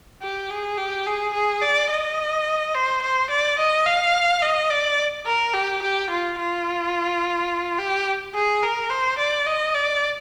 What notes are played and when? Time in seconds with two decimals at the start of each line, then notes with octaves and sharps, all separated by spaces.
0.22 G4
0.50 G#4
0.77 G4
1.06 G#4
1.34 G#4
1.62 D5
1.90 D#5
2.74 C5
3.02 C5
3.30 D5
3.59 D#5
3.86 F5
4.42 D#5
4.70 D5
5.26 A#4
5.54 G4
5.82 G4
6.10 F4
6.39 F4
7.79 G4
8.35 G#4
8.63 A#4
8.90 C5
9.18 D5
9.46 D#5
9.75 D5